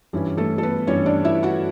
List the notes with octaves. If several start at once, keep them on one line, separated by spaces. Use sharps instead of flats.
G2 E3 G3 C#4 E4
A3 A4
A4
B3 B4
G2 E3 G3 C#4 E4 C#5
D4 D5
E4 E5
F#4 F#5